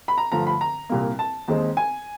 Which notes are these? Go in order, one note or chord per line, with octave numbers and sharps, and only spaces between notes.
B5
A#5
G2 D3 F3 A3 A#5
B5
A#5
C2 A#2 G3 A#3
A5
D#2 D#3 G#3 C4 D#4
G#5